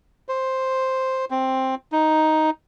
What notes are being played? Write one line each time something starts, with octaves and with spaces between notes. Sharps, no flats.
C5
C4
D#4